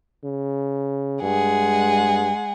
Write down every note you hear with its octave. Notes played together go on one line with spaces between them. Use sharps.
C#3
G2 G#3 G#4 F#5